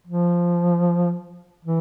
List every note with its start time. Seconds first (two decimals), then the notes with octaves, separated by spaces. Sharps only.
0.07 F3
1.65 E3